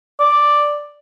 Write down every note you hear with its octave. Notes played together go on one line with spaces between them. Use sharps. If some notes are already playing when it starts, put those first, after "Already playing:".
D5